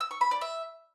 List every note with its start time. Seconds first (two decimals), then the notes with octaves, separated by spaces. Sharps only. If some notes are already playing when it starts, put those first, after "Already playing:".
0.01 E6
0.11 C#6
0.21 B5
0.31 D5
0.41 E5